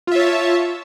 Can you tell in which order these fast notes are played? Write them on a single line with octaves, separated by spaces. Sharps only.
F4 E5 C#5 A5